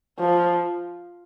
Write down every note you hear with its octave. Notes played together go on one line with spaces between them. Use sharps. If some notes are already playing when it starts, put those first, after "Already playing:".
F3